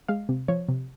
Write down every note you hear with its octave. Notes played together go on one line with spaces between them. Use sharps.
G#3 F5
C3
F3 C#5
C3